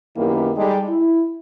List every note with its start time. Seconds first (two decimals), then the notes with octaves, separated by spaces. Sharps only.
0.16 F#2 D#3 A#3 B3 E4 G4
0.56 G3 G#3 D#4 G4 A4
0.89 E4